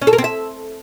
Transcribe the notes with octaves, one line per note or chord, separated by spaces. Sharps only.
C#4
A4
A#4
C4
E5